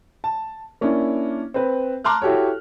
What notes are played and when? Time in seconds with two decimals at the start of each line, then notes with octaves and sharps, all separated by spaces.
0.24 A5
0.81 A#3 C#4 D4 E4
1.54 C4 B4
2.04 A5 A#5 C6 D6 F6 F#6
2.22 E4 F#4 G4 A4 C#5